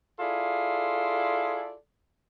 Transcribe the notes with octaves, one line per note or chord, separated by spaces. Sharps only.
E4 F4 G#4 A4 D5